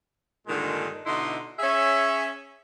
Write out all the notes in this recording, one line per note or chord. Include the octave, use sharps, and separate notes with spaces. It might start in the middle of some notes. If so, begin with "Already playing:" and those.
G2 A#2 D3 D#3 G#3
B2 D3 D#4 E4 D#5 C6
C#4 G#4 C#5 E5